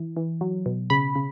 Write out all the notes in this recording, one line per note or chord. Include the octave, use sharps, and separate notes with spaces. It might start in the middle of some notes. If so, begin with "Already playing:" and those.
Already playing: E3
E3
F#3
B2
C#3 B5
C#3